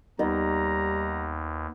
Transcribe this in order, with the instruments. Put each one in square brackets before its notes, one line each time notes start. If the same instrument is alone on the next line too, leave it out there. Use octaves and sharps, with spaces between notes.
[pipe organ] D#2 [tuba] G3 [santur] B3 D#4 D#5 [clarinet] A#5